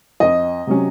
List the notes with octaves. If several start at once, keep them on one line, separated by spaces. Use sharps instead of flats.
F2 D#5
C3 F#3 C#4